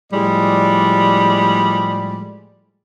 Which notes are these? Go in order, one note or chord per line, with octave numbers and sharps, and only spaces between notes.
A2 F3 G3 G#3 D5